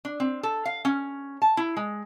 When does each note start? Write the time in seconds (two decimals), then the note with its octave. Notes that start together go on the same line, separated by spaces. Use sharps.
0.05 D4
0.20 C4
0.43 A4
0.65 F5
0.85 C#4
1.42 A5
1.57 E4
1.77 G#3